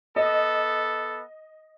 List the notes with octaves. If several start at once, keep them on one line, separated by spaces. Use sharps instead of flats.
B3 A4 D#5